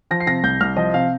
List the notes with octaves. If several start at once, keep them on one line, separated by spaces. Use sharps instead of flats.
F3 A#6
C7
C3 A#6
C2 G6
C2 F6
F3 D#5
C3 F5